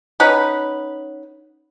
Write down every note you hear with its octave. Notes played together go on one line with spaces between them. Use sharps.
C#4 D#4 B4 F#5